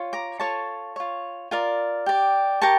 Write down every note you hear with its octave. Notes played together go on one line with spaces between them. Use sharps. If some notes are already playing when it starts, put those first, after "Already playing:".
Already playing: F4 C#5
A#5 D6
F4 A4 C#5 A5 C#6
F4 C#5
F4 A#4 D5
G4 D5
G4 A#4 A5 C#6